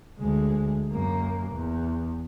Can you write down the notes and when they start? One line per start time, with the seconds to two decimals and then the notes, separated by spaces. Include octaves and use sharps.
0.19 D2 G#3
0.92 F#2 A#3
1.52 E2